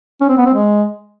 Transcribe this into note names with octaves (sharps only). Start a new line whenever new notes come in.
C#4
C4
B3
C4
G#3